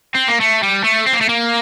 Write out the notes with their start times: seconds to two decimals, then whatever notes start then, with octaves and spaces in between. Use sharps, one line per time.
0.15 C4
0.28 A#3
0.41 A3
0.63 G3
0.84 A3
1.06 C4
1.13 A#3
1.21 A3
1.29 A#3